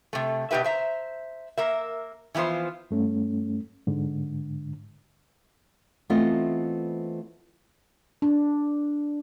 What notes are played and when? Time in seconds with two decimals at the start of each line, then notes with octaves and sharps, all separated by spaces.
0.13 C3 A3
0.51 B2 G#3 G4 B4 E5
0.64 C5 E5 A#5
1.58 A#3 A#4 E5
2.35 E3 F3 B3 F4 C5
2.91 G2 A3 C#4
3.87 G#2 D3
6.10 E3 A3 B3 C4 F4 D#5
8.22 D4